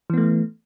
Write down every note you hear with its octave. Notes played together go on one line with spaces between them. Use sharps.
E3 A3 B3